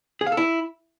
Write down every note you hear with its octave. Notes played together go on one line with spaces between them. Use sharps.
G#4
F5
A4
E4